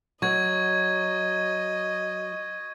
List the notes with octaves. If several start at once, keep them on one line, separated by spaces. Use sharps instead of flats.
F#3 D#5 C#6 G#6